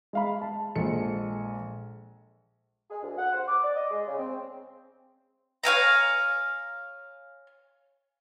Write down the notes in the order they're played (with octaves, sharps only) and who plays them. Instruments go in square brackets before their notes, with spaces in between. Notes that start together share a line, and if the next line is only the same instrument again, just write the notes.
[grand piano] G#3 F5 B5
A5
A#1 G#3 A4 C#7
[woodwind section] G#4
D2
F#5
C5
D6
D5
D#5
G#3
C#3
C4
[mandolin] C#5 F5 G#5 A#5